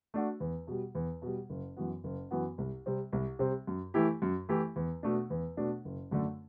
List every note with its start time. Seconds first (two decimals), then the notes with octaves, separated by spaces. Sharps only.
0.14 A3 D4 F#4
0.40 E2
0.67 B2 G3
0.95 E2
1.22 B2 G3
1.50 F#1
1.77 F#2 E3 B3 F#4
2.04 F#1
2.31 F#2 E3 B3 F#4
2.58 C2
2.86 C3 G3 C4
3.12 C2
3.39 C3 G3 C4
3.67 F#2
3.94 E3 A3 E4 G4
4.22 F#2
4.49 E3 A3 E4 G4
4.76 E2
5.03 B2 A3 D4
5.30 E2
5.57 B2 A3 D4
5.85 F#1
6.11 F#2 D3 A3 D4